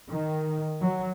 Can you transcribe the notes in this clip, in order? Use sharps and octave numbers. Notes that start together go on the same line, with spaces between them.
D#3
F#3